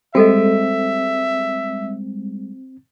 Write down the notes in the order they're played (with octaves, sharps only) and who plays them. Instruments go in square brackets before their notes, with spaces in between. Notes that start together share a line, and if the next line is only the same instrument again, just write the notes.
[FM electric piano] G3 G#3 [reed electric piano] C4 [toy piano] F#4 A4 D#5 [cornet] E5